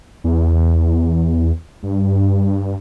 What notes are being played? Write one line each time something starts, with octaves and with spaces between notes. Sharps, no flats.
E2
G2